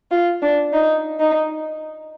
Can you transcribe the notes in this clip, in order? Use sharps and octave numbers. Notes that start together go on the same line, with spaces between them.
F4
D4
D#4
D#4